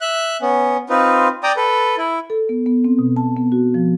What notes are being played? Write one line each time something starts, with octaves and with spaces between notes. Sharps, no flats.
E5 F#6
B3 C#4
C4 D#4 F4 B4
D5 G5 A#5 D#6
A4 B4
E4
A4
B3
B3
C4
B2
A5
B3
F#4
F3